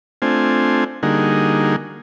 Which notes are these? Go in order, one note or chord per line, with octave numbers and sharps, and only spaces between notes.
A3 C4 D4 F4 C5 G#5
D3 G3 A#3 D#4 F#4 G#4